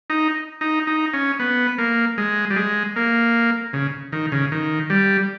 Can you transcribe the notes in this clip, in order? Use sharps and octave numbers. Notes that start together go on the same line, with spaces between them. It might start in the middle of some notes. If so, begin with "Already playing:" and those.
D#4
D#4
D#4
C#4
B3
A#3
G#3
G3
G#3
A#3
C#3
D#3
C#3
D#3
G3